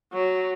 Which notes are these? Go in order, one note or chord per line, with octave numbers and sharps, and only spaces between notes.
F#3